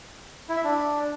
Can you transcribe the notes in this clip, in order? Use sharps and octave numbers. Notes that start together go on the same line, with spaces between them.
E4
E5
D4